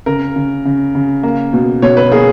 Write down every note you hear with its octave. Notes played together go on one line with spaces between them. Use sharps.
C#3 A#4
C#3
C#3
C#3
A#3
B2
B2 C#5
B4
A#3 G#4